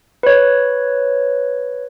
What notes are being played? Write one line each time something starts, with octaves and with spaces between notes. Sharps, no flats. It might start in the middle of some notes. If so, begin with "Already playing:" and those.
B4 C#5